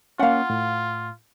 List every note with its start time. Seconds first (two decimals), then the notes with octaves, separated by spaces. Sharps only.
0.19 A#3 C#4 F4 F5 F#5
0.50 A2